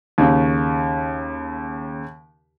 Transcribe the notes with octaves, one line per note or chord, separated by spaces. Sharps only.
D#2 C#3